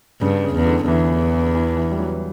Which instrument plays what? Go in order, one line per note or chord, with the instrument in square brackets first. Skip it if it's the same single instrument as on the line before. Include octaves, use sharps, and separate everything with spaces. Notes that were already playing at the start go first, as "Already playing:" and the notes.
[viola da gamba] G2 [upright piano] C#3
[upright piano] C#3
[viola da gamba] E2
[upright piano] D3
[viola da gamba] E2 [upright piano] E3
[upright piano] E3
E3
G3
F#3